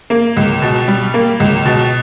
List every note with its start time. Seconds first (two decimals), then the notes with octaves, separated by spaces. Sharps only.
0.10 A#3
0.36 C#2
0.62 B2
0.88 G3
1.14 A#3
1.40 C#2
1.65 B2